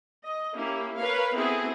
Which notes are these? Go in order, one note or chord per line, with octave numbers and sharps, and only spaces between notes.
D#5
A#3 C#4 E4 G4
A#4 B4 C#5 F5
B3 C4 E4 F#4 G#4 A4